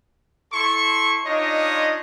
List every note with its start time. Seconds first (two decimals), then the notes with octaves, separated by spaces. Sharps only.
0.53 E4 A4 C6 C#6
1.26 D4 D#4 F4 C#5 D#5